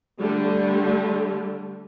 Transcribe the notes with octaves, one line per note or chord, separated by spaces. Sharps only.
D3 G3 A3